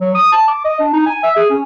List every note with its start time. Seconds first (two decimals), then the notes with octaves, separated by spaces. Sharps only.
0.01 F#3
0.15 D#6
0.32 A5
0.48 D6
0.65 D#5
0.80 D4
0.93 D#4
1.07 G#5
1.24 E5
1.37 G#4
1.50 C#4